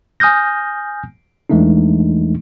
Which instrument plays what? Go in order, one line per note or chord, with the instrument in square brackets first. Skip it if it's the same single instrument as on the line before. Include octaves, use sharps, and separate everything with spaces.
[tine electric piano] G#5 D#6 F6 G6 A#6
E2 E3 G#3 A3 D4 D#4